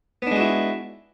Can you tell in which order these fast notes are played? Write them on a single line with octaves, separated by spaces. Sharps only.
B3 D4 G#3 F#4 E4